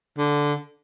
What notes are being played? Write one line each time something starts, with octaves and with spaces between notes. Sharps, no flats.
D3